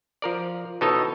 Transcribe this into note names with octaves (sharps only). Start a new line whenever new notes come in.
F3 A#4 D5
B2 E3 D#4 A4 C#5 D#5